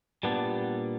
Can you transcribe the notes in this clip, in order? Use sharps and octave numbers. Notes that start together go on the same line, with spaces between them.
A#2 G3 B3 D4